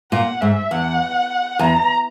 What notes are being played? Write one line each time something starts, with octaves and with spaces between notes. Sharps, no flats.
A#2 F#5
G#2 E5
E2 F#5
E2 A#5